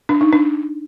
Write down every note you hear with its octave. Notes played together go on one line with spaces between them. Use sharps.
D4
D#4
D4